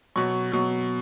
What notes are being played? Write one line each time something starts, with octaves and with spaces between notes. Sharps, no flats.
B2 F#3 C#6
B2 F#3